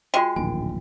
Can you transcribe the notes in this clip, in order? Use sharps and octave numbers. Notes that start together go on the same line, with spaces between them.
G#3 F4 F#4 G5
D1 A#1 D#3 G#5